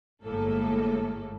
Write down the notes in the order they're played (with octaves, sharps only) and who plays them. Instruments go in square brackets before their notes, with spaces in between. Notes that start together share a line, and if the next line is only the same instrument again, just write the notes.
[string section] G1 A2 G#3 A#3 A4